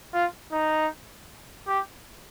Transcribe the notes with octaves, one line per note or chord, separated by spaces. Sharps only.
F4
D#4
G4